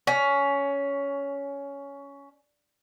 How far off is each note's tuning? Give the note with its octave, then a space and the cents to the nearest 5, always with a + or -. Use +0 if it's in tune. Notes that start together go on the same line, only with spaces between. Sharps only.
C#4 +15